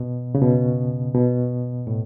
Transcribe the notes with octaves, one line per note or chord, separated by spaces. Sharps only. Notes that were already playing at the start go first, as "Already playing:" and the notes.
Already playing: B2
C#3
B2
B2
A2